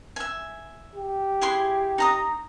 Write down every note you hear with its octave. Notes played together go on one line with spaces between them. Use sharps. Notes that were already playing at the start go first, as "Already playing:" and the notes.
E5 G#5
G4
E4 G#4 C6
D#4 A#5 D#6